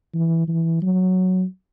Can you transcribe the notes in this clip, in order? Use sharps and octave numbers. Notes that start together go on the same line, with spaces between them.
E3
E3
F#3